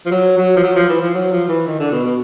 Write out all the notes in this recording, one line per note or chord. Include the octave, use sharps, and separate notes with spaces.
F3
F#3
F#3
F3
F#3
F3
E3
F3
F#3
F3
E3
D#3
D3
B2
B2